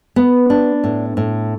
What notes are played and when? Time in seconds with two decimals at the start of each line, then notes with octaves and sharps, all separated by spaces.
0.16 B3
0.50 D4
0.84 A2
1.17 A2